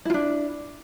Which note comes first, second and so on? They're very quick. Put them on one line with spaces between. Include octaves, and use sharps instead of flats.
E4 F4 D4